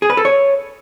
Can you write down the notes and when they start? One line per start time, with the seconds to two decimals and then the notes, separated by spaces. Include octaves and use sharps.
0.02 G#4
0.10 B4
0.17 A4
0.25 C#5